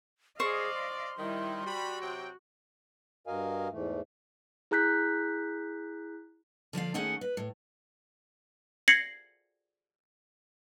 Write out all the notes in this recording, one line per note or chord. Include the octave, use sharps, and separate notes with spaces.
G#4 C5 D5 D#5 F5 C#6
C6
D#3 G3 D#4 E4
G3 F#4 B5
C3 F#3 G5
G2 F#4 A#4 D#5 F5 G#5
E2 G#2 E3 A3
E4 G#4 A#5 F#6 G6 B6
D3 F3 D5 F5
D#3 A3 C#4 G#4 F#5
B4
A2
G#6 A#6 C7 C#7 F#7